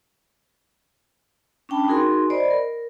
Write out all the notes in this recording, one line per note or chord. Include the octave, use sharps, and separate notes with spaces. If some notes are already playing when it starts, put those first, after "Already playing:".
C#4 D4 G5 A5 B5
D#4 F#4 G#4 A#4 G#5 C6
C5 D5 D#5 B5
A#4